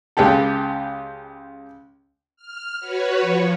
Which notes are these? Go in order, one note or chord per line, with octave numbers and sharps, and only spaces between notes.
C#2 G#3 G4 A4
F6
F#4 B4 C#5
F3